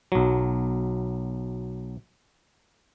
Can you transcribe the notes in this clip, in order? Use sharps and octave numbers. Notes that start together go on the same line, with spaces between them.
B1 F#3